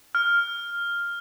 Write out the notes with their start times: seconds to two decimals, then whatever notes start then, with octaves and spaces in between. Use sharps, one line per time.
0.15 F6